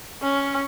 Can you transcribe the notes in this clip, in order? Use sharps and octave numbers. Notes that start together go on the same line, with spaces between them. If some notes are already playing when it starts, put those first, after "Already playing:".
C#4